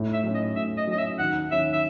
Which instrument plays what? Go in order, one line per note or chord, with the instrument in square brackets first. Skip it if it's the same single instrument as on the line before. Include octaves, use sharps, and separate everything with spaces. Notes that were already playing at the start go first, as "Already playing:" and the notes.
Already playing: [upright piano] A2
[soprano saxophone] E5
[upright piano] F#3 C#4
[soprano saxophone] D#5
[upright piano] A2 [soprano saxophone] E5
[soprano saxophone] D#5
[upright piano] F#3 C#4 [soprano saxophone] D#5
[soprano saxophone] E5
[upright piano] D#2 [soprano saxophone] F#5
[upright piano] D#3 F#3 C#4 E4 [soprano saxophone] E5
[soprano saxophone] E5